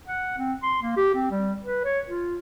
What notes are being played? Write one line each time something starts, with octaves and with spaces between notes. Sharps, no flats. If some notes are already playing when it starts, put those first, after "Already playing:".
F#5
C4
C6
A#3
G4
C4
G3
B4
C#5
F4